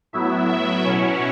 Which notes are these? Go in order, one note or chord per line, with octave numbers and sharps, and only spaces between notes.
A2 F#3 B3 E4 E5
E5
B2 F#3 C#4 E4 C#5